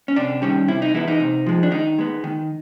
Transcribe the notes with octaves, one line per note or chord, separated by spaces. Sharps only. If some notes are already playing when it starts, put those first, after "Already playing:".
C#4
C3 D4
D#3 G3 C#4
C3 E4
D#4
E3 G#3 B3 E4
D#4
C3
F3 G#3
D4
D#3 D#4
G#3 B3
D#3